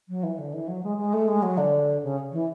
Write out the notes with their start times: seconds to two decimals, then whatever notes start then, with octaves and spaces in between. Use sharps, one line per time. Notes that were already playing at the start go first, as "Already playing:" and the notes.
0.08 F#3
0.23 E3
0.38 D3
0.53 E3
0.67 F#3
0.83 G#3
0.97 G#3
1.13 A3
1.28 G#3
1.42 F#3
1.57 D3
2.03 C#3
2.32 E3